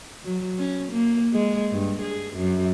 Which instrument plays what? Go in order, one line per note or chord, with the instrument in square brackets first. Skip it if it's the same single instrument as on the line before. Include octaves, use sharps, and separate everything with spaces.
[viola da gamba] F#3
C#4
A#3
G#3
G2
G#4
F#2